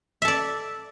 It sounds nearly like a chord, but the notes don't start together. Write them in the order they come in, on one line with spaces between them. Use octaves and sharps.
E5 A4 D5